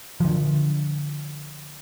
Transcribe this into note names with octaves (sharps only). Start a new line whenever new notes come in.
D3 F3